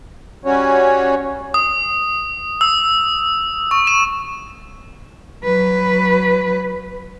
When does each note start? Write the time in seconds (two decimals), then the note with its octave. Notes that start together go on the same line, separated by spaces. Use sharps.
0.45 G3 C#4 F#4 C#5
1.54 D#6
2.61 E6
3.71 C#6
3.87 E7
5.44 F#3 B4